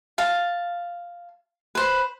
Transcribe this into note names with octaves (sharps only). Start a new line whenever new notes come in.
F5 A5
B4 C5